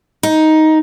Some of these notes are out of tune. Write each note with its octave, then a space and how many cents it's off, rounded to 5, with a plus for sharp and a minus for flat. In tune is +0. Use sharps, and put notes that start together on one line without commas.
D#4 +10